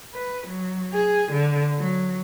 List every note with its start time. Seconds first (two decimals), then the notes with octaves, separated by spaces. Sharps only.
0.14 B4
0.47 F#3
0.93 G#4
1.32 D3
1.78 F#3